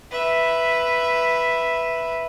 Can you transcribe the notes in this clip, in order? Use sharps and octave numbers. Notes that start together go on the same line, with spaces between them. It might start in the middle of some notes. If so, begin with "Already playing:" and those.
B4 E5